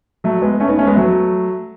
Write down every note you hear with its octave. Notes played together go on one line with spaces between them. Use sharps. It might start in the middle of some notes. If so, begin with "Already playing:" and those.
F#3 A3
G#3 B3
A3 C#4
B3 D#4
A3 C#4
G#3 B3
F#3 A3